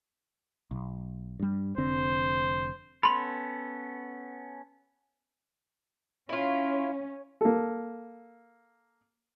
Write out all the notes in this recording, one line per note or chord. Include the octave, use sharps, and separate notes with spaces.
B1
G2 G3
F1 D3 C4 C5
B3 C#4 A4 B5 C6 F7
C#4 E4 F4
A#3 A4